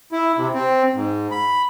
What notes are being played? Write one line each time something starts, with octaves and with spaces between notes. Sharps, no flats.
E4
C3
C4
G#2
B5